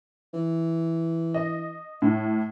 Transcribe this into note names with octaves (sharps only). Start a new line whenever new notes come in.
E3
D#5
A2